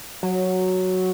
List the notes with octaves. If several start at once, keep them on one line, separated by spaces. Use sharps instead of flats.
F#3